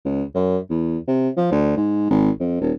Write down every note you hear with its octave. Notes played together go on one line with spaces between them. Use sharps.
C#2
F#2
E2
C3
F3
D2
G#2
G#1
F2
D#1